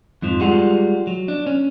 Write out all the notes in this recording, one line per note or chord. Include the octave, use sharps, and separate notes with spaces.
F2 G#2 F3
G3 G#3 F4 F#5
F#3
D4
C#4